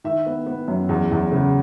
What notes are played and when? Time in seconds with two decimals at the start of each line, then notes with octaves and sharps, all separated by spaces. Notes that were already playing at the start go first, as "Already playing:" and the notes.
0.04 D#3 E5
0.26 B3
0.46 B3
0.68 F#2
0.89 E2
1.11 E2
1.32 C#3